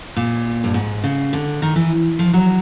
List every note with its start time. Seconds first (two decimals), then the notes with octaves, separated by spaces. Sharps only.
0.16 A#2
0.64 G2
0.74 G#2
1.04 C#3
1.33 D3
1.62 D#3
1.76 E3
2.19 F3
2.33 F#3